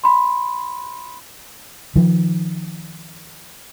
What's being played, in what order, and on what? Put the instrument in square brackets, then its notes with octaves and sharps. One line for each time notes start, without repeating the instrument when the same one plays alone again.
[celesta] B5 C6
[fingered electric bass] D#3 F3